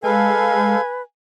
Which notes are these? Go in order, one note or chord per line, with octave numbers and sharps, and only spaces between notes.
G#3 A4 B4 F5 G#5